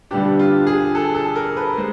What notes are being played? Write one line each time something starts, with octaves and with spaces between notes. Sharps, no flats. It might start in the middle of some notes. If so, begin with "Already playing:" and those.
G2 D3 G3 B3 D4 G4
F4
G#4
A4
A4
A#4
B4
G#3 C5